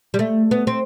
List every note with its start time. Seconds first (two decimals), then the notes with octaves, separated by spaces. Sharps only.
0.14 G3
0.19 A3
0.51 B3
0.67 C4